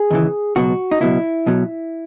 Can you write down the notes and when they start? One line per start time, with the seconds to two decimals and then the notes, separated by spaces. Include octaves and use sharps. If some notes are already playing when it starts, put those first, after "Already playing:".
Already playing: G#4
0.11 D#2 C#3 E3
0.56 C#2 B2 F#3 F#4
0.91 D#4
1.01 C#2 B2 F#3 E4
1.46 B1 B2 F#3